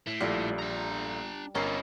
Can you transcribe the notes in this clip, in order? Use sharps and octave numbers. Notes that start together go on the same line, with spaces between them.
A2
A#1 G3 F4 A4
D4 A#5
G1 C#4 D#4 E4 A#4 C7